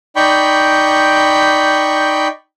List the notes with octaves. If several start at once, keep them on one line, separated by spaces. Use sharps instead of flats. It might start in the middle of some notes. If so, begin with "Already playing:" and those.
D#4 D5 G5 B5 C#6 G6